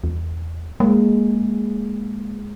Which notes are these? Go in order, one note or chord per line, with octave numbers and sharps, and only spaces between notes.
E2
G#3 A#3